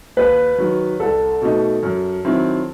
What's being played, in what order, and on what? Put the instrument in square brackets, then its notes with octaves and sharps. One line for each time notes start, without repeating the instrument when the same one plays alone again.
[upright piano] D#2 [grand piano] B4
[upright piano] D#3 F#3
[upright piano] C2 [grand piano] A4
[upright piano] B2 A3 D#4
F#2
D#3 F#3 C4 E4